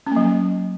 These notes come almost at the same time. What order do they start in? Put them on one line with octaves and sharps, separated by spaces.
C#4 A#3 F#3